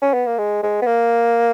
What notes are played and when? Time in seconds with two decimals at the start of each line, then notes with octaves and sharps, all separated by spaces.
0.02 C#4
0.14 B3
0.27 A#3
0.38 G#3
0.63 G#3
0.82 B3
0.86 A#3